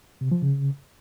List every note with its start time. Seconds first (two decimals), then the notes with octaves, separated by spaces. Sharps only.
0.21 C3
0.32 F3
0.42 C#3